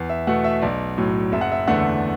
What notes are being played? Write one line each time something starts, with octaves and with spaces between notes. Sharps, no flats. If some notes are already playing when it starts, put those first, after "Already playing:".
Already playing: E2
E5
B2 A3 F#5
E5
B1 D5
A2 F#3
F#1 E5
F#5
E5
E2 D3 A3 F#5